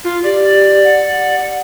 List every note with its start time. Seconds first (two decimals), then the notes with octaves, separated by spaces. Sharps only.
0.04 F4
0.24 G4 D5
0.84 F#5